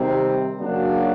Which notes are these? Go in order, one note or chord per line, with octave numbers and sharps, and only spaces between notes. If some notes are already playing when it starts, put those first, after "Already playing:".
Already playing: C3 D#3 G3 C4
C#3 F#3 A#3 D4 F#4